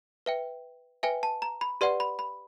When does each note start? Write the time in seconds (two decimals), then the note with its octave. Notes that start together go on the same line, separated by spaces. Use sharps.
0.26 B4 E5 G5
1.03 B4 E5 G5 G#5
1.23 A5
1.42 A#5
1.61 B5
1.81 G4 B4 D5 F#5 C6
2.00 B5
2.19 B5